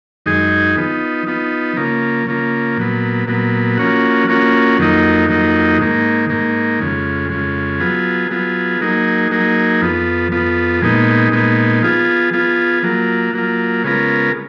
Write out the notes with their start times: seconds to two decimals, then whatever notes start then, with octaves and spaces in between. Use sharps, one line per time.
0.26 F#2 D#3 G#3 D#4 G#4
0.77 F3 B3 D#4
1.27 F3 B3 D#4
1.77 C#3 F3 A#3
2.27 C#3 F3 A#3
2.77 A#2 F#3 B3
3.28 A#2 F#3 B3
3.77 F3 A#3 C#4 F#4
4.28 F3 A#3 C#4 F#4
4.79 F2 D#3 F#3 A#3 D#4
5.28 F2 D#3 F#3 A#3 D#4
5.79 G#2 D#3 A#3
6.29 G#2 D#3 A#3
6.80 F2 C#3 G#3
7.30 F2 C#3 G#3
7.80 F#3 B3 F4 G#4
8.30 F#3 B3 F4 G#4
8.81 F#3 A#3 D#4 G#4
9.31 F#3 A#3 D#4 G#4
9.81 F2 F3 B3
10.32 F2 F3 B3
10.82 A#2 G#3 B3 D#4
11.32 A#2 G#3 B3 D#4
11.82 F3 B3 F4 G#4
12.33 F3 B3 F4 G#4
12.83 F#3 A#3 F4
13.33 F#3 A#3 F4
13.84 C#3 G#3 B3 F4 A#4